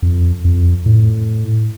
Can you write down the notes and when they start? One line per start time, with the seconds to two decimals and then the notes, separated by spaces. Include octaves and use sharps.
0.02 F2
0.45 F2
0.86 A2